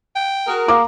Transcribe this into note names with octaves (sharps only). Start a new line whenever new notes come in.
G5
F#4 G#4 A#4
A#3 F5 A#5 D6